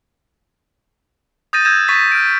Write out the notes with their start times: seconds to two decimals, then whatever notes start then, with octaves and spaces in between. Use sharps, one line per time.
1.53 D#6 G6 A6 A#6 D#7
1.65 E6 G6 G#6 A#6 E7
1.88 C#6 D#6 A6 B6
2.12 F6 D7